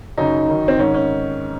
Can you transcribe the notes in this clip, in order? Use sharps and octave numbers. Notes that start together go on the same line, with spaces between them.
F#2 C#3 D#4
F#2 D#3
C4
G#2 D#3 C#4
C#4